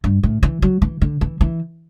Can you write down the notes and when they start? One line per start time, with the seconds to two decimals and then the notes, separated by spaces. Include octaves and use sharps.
0.04 G2
0.23 A2
0.43 E3
0.62 F#3
0.82 E3
1.01 D3
1.21 E3
1.41 E3